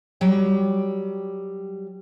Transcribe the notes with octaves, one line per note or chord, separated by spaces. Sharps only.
F#3 G3 G5